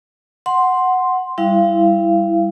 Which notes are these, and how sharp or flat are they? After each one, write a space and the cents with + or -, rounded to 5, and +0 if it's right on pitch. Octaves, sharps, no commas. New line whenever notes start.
F#5 +0 C6 +0
G3 +0 E4 +0 F5 -30